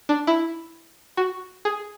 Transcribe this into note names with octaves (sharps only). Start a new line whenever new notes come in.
D4
E4
F#4
G#4